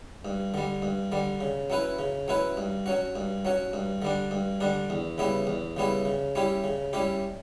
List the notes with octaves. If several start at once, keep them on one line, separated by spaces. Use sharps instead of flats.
G2
D3 G3
G2
D3 G3
C#3
F#3 C#4 E4 B4
C#3
F#3 C#4 E4 B4
G2
F#3 C#4 F#4
G2
F#3 C#4 F#4
G2
D3 G3 D4
G2
D3 G3 D4
E2
C#3 G3 B3 E4
E2
C#3 G3 B3 E4
C#3
G3 C#4 E4 G4
C#3
G3 C#4 E4 G4